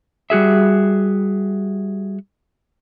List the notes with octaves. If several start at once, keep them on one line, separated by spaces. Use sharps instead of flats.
G3 F#4 G#4 E5